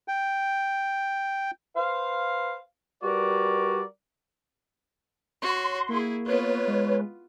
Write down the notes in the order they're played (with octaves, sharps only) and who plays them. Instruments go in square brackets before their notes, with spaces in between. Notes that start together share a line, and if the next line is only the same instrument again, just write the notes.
[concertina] G5
[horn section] B4 C5 F5
G3 F#4 A#4 B4 D5
[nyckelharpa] F#4 [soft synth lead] C#5 [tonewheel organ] C6
[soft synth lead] A#3 [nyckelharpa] E4 G#4
[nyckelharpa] B3 F4 [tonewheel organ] B4 C#5
[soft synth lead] G#3